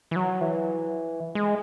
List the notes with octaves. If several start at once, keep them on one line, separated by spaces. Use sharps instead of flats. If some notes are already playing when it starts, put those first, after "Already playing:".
E3
F#3
E3
G#3